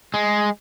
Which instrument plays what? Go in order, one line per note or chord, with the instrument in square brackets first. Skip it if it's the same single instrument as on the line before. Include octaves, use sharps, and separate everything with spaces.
[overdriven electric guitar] G#3